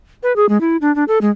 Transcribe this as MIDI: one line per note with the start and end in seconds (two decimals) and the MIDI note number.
0.23 0.35 71
0.36 0.49 68
0.49 0.60 56
0.61 0.77 64
0.81 0.94 62
0.96 1.04 62
1.08 1.19 69
1.21 1.31 56